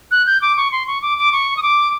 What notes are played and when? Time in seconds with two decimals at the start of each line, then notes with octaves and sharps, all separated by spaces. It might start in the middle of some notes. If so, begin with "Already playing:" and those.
0.11 F#6
0.27 G6
0.42 D6
0.57 C#6
0.72 C6
0.87 C#6
1.02 D6
1.18 D6
1.32 C#6
1.57 D#6
1.63 D6